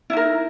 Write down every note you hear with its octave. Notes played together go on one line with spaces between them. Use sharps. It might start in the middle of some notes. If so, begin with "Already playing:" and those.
D#4 E4 A#4